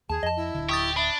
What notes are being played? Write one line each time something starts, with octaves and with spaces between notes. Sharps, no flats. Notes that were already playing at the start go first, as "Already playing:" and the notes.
D#2 G#4 A5
F2 D#5 A5
E4
D1 D3
G4 C#6 D#6 A6
D4 E5 B5